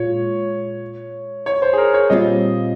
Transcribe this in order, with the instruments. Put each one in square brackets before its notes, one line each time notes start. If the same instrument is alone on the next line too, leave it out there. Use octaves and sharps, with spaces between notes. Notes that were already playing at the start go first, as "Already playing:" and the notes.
Already playing: [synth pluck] A#2 G#3 F4 [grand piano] C#5
[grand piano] C#5
C5
G#4
A#4
C#5
[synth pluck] A#2 G3 C4 F4 [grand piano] D#5